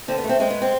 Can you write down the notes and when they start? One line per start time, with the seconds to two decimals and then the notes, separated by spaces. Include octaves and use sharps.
0.08 D3 C4
0.18 B3
0.24 A3
0.29 C4
0.40 G#3 C4
0.51 B3
0.62 C4